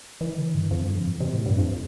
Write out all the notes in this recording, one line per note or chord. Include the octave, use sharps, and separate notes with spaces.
E3
D3
G2
F2
G2
F3
E3
C3
A2
G2
F2